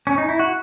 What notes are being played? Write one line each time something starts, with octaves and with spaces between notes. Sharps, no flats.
C#4
D#4
E4
F#4